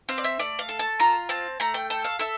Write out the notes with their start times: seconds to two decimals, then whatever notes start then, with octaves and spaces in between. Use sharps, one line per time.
0.09 C4 F5
0.18 D5
0.24 E5
0.39 A3 D5
0.59 F5
0.69 A4
0.79 A5
1.00 F4 A#5
1.29 C4 A5
1.60 A3 A#5
1.74 G5
1.90 A4 G5
2.04 F5
2.19 A4 E5